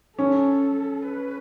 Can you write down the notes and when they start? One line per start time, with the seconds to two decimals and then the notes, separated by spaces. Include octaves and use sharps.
0.18 C#4 A4
1.08 B4